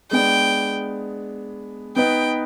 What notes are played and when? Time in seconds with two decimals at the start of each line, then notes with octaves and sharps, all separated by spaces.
0.11 G#3 B3 D4 G5
1.96 B3 D#4 B4 G5